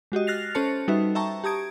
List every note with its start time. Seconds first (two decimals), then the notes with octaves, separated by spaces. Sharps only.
0.12 G#3 F#4 G4 D#5
0.27 F6 F#6 A6 A#6 C7 F7
0.55 C#4 A4 C5 A5 C#7
0.88 G3 D#4 F#4 B4 E5
1.15 E5 G5 A5 A#5 C#6
1.44 G4 A5 A#5 D#6 G#6 D7